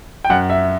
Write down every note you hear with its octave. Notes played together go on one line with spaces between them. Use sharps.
G5
F#2 F#5
E5